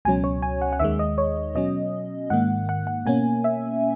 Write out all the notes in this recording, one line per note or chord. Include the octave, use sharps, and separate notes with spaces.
C#2 B2 F#3 C#4 G#5
C#5
G#5
F#5
F#5
D#2 D#3 G#3 E5
D#5
C#5
B2 F#3 C#4 D#5
G#2 D#3 A#3 F#5
F#5
F#5
B2 A#3 C#4 G#5
E5